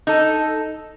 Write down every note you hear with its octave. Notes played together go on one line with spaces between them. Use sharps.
D#4 A4